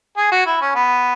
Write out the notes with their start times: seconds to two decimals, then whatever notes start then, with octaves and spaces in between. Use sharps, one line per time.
0.17 G#4
0.32 F#4
0.47 E4
0.61 C#4
0.75 B3